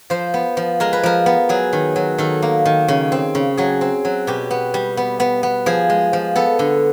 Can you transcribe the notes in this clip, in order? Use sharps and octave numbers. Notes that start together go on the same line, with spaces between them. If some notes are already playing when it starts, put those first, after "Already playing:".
F3 C5
B3
F3
G#3 A#4
B4
F3 A#4
B3
F#3 G#4
D#3
F#3
D#3 A4
A#3
D#3
C#3
C4
C#3
F#3 G#4
C4
F#3
B2 G4
B3
G3
B3
B3
B3
F3 G#4
G#3
F3
B3 A4
D3